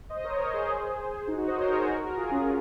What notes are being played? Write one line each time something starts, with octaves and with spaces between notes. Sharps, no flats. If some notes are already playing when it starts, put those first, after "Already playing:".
C5 D#5
A#4 C#5
C5 D#5
G#4 C5
D#4 F#4
D#4 F#4
C5 D#5
A#4 C#5
G#4 C5
F#4 A#4
F#4 A#4
F4 G#4
C#4 F4